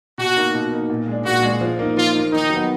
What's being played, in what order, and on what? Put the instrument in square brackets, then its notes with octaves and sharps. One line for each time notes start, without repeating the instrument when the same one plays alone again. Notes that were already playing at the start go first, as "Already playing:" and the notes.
[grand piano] B2 [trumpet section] F#4
[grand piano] A#3 D#4
B2
A#3 D#4
A#2
G#3 D4
[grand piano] A#2 [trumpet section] F#4
[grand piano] G#3 D4
F3
A#3 D#4
[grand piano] F3 [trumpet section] F4
[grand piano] A#3 D#4
[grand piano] D#3 [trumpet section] D#4
[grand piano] F#3
B3